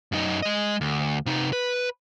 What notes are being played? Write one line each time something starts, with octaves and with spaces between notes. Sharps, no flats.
F#2 D#4
G#3 D#5
D2
C3 D#4
B4